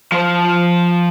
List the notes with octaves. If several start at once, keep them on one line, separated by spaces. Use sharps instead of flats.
F3 C5